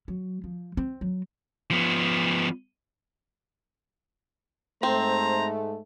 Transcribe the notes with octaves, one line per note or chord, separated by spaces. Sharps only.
F#3
F3
C4
F#3
F3 B3
G#2 A3 C4 C5 A#5